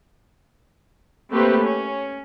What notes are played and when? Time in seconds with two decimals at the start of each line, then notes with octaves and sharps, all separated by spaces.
1.31 A3 A#3 C4 G4 B4
1.64 C#4